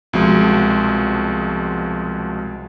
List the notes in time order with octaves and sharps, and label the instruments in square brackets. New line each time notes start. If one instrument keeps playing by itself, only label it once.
[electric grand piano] C2 B2 F3 G#3 F#4